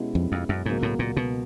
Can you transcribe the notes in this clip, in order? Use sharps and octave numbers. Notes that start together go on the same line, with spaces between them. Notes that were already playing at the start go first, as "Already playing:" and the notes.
Already playing: B2 G#3 C#4 E4 G4
F2
F2
F#2
C#2 G#2 B2 F#3 A#3
A2
A#2
B2